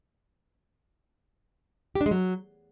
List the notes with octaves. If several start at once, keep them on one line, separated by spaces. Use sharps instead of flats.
G4
D4
G#3
F#3